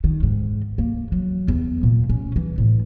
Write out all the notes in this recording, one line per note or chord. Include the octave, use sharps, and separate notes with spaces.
D#3
G#2
A#3
F#3
E2
A#2
C#4
E3
A2